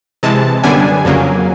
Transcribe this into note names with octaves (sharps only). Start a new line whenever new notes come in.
C3 E3 G#3 A5
F#2 D3 G3 B3 D4 G#5
F2 C#3 F#3 A#3